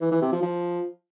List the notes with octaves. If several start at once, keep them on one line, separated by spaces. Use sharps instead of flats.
E3
E3
C3
F3
F3